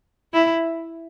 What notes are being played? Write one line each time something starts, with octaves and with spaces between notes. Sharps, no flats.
E4